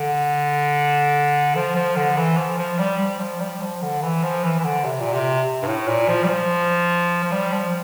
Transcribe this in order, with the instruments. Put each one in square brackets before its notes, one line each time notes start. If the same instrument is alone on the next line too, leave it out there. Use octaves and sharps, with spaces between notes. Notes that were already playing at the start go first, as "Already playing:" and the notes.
Already playing: [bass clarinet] D3
F3
F3
D3
E3
F3
F3
G3
G3
F3
G3
F3
D3
E3
F3
E3
E3
D3
C3
A#2
C3
G2
A2
A#2
F3
G3
F3
F3
G3
F3